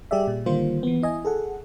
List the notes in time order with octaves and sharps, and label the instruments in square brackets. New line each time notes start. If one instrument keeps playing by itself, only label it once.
[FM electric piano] G3 G4 G#4 D5 E5
A#2
D3 D#3 G3 A#3 F4 C5
E3 B3
E4 D#5 G#5
G#4 A4 F#5